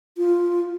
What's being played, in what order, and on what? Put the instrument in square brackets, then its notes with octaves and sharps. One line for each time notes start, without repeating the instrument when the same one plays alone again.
[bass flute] F4